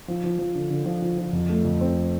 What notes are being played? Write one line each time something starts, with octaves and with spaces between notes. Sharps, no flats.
F3
F3
F3
D3
D3
F3
F3
F3
F2
A3
F2
C4